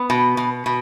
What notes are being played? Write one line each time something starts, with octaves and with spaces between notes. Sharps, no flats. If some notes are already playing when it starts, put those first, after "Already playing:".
Already playing: B3
B2
B2
B2